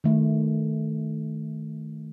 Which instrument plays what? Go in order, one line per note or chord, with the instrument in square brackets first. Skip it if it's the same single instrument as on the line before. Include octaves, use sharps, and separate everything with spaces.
[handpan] D#3 A3